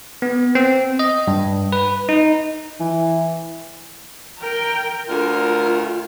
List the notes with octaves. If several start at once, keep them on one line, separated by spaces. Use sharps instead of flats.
B3
C4
D#5
G2
B4
D#4
E3
A#4 G5
D2 D3 F4 A#4